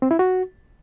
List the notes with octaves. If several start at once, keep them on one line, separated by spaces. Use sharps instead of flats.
C4
E4
F#4